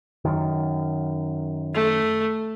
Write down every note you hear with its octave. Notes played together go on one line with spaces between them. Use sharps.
F#2 D#3
A3